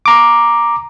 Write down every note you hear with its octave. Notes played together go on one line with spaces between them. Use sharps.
A#5 D6